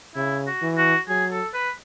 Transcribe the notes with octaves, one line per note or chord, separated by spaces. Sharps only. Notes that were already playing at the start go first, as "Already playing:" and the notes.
C#3 E4
F#4
E3
F#4
F#3 G#4
A4
B4